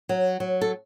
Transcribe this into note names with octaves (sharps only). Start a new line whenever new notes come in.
F#3
F#3
A4